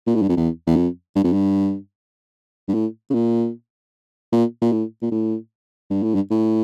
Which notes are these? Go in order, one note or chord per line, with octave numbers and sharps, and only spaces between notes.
A#2
A2
G2
F2
E2
E2
F2
G2
F2
G2
G2
A2
C#3
A#2
A#2
A#2
A2
A#2
A2
G2
A2
G2
A2